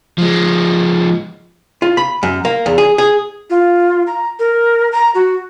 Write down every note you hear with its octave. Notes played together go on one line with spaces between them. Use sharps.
F3 G#3
F4
B5
F#2
A#3
E2
G#4
G#4
F4
A#5
A#4
A#5
F#4